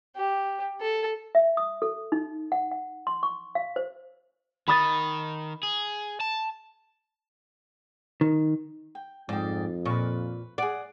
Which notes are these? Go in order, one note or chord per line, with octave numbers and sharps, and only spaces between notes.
G4
A4
E5
D#6
A4
D#4
F#5
F#5
C6
C#6
F5
C5
D#3 B5 D#6 A6
G#4
A5
D#3
G5
F2 G#2 D5 G5
A#2 B4 C#6
G#4 D5 F#5